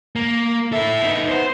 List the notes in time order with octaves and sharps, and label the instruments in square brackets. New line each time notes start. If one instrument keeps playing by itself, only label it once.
[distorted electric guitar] A#3
[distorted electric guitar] E4 A4 [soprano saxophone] E5
[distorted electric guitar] B3 D#4
[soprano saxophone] B3 [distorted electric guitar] C5 C6